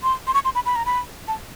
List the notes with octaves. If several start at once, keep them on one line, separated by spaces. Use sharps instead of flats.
C6
C6
C#6
C6
B5
B5
A#5
B5
A5